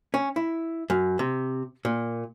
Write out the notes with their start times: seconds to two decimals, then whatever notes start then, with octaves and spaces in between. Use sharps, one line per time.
0.14 C#4
0.36 E4
0.90 F#2
1.19 C3
1.85 A#2